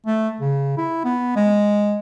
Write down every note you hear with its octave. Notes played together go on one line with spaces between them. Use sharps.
A3
C#3
E4
B3
G#3